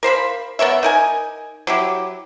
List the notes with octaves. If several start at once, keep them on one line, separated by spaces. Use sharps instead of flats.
A#4 C5 F5 B5
B3 A#4 C#5 E5
D#4 A#4 G#5
F#3 E4 G4